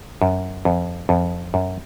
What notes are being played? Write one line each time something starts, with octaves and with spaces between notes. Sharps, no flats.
F#2
F2
F2
F#2